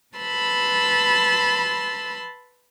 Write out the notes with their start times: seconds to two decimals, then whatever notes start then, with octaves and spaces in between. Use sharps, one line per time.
0.16 B4 A5 B5 C6 E6